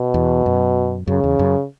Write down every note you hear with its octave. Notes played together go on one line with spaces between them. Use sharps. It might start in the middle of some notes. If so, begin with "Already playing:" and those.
Already playing: B2
E2
F#2
F#2 C#3
E2
F#2